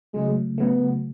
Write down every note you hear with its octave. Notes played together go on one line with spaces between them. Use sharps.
C#3 F#3 G#3 A3
C#3 F#3 A3 B3